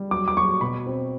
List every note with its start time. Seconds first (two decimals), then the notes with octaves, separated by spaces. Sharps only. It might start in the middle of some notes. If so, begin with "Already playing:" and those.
Already playing: G3
0.11 F#3 D6
0.28 D6
0.37 F#3 C#6
0.61 B2 B5
0.87 C4